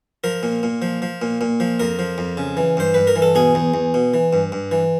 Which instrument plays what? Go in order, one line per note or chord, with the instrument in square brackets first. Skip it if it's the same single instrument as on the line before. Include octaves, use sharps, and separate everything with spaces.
[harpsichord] F3 A#4
A#2
A#2
F3
F3
A#2
A#2
F3
F2 A#4
F3
F2
C#3
E3
G2 C5
G2 B4
A#4
E3
A4
B2 G#4
E2
E2
B2
E3
G2
G2
E3